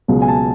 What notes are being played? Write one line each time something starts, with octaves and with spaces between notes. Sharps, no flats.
C#2 B2 F#3
G#5
A5